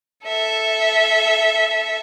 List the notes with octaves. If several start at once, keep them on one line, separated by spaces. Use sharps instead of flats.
A4 E5